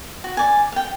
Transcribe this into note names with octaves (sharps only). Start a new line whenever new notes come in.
F#4
D5 G#5
F5 G5